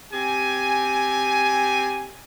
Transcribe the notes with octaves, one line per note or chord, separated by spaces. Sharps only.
C4 G4 G#5